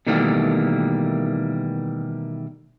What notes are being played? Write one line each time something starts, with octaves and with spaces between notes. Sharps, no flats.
B2 D#3 E3 G3 A3 A#3